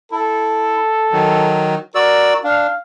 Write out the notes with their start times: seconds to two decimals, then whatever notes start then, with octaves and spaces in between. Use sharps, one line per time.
0.12 E4 A4
1.12 D#3 F#3
1.95 F#4 A#4 D5 E6
2.44 D4 F5